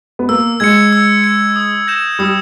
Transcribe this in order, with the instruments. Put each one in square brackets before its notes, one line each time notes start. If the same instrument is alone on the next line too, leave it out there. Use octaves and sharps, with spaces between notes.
[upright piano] B3
[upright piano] A#3 [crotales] E6
[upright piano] G#3 [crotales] G#6 C#7
[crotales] E6
G#6 C#7
D#6
G6 A#6 E7
[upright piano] G3 [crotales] D#6